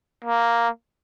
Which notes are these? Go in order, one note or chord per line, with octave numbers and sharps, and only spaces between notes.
A#3